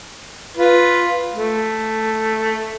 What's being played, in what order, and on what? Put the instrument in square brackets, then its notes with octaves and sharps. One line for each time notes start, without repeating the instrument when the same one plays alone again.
[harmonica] F4 B4
A3